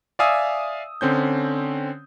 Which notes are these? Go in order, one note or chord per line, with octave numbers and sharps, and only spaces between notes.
D5 E5 F5 G#5 D#6 E6
D3 C4 C#4 G6